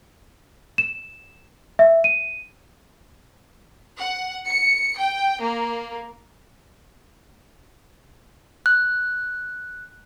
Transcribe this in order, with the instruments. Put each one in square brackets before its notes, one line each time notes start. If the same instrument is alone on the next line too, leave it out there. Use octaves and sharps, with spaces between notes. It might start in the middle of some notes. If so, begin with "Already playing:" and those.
[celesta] E7
E5
D#7
[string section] F#5
C#7
G5
A#3
[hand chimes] F#6